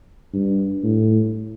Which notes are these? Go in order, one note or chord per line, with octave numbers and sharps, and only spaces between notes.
G2
A2